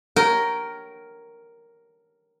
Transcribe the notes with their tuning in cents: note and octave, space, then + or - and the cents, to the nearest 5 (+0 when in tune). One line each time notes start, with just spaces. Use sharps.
A#4 +0 C#5 +0 G5 -30